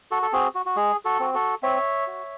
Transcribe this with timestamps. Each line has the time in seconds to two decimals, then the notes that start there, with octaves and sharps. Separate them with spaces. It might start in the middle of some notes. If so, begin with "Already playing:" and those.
0.11 F#4 A4
0.22 A4
0.33 C4 F#4 G#4
0.55 F#4
0.66 F#4
0.76 G#3 G#4
1.05 F#4 A4
1.20 C4 F#4
1.34 F#4 A4
1.63 C4 C#5 E5
2.07 F#4